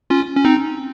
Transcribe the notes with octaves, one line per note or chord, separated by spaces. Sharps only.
C#4 F4
C#4
C4 D#4